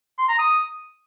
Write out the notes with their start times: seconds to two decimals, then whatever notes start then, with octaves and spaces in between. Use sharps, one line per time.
0.18 C6
0.28 A#5
0.38 D#6